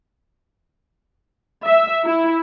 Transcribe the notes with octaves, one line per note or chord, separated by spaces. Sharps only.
E5
E4